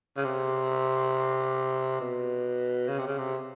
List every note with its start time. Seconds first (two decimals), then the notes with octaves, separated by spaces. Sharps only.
0.17 C#3
0.24 C3
2.00 B2
2.88 C#3
2.98 C3
3.07 C#3
3.18 C3